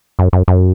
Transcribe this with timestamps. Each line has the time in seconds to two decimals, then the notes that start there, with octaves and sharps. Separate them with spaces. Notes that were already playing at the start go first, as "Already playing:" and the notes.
0.19 F#2
0.33 F#2
0.48 F#2